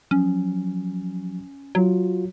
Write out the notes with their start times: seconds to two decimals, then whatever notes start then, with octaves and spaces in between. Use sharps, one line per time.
0.11 F3 F#3 C#4
1.75 F#3 F4 F#4